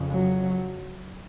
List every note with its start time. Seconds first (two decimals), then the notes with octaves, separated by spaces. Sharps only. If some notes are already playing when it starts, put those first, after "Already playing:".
Already playing: F2 C#3
0.11 F#3